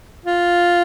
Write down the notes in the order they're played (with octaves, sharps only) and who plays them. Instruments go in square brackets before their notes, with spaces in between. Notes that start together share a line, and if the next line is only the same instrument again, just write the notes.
[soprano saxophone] F4